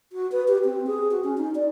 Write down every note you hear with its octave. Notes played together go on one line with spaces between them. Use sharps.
F#4
B4
G4
C4
G#4
F#4
C#4
D#4
D5